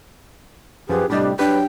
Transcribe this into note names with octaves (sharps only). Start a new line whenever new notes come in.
F#2 F3 G4 G#4 B4
A2 C3 G3 D4 G4 D#5 G5 B5
F#3 D4 G4 B4 G5